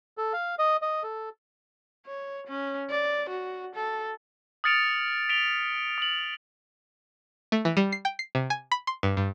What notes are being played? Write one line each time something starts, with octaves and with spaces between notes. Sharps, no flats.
A4
F5
D#5
D#5
A4
C#5
C#4
D5
F#4
A4
D#6 F6 A6 C#7 D7 F7
B6 D7 F7 G7
D#6 F#7
A3
E3
G3
C7
G5
C7
C3
G#5
B5
C6
G2
G2